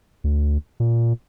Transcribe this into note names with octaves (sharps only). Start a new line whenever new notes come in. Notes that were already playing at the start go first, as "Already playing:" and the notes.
D2
A#2